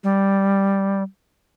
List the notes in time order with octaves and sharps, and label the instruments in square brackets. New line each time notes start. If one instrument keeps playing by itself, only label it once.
[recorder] G3